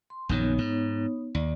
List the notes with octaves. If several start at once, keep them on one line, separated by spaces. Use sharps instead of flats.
C6
A#1 F#2 D#3 B3 D#4 C#5
G#2
D#2 D5